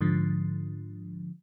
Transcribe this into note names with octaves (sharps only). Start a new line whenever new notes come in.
G#2 D3 F3